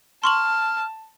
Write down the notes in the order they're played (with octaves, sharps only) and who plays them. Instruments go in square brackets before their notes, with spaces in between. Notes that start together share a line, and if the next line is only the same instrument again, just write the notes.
[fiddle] A5 [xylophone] C6 C#6 F#7 [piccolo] F6